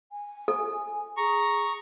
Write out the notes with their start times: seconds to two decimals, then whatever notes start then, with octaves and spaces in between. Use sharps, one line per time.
0.12 G#5
0.48 A4
1.17 G#4 A#5 C#6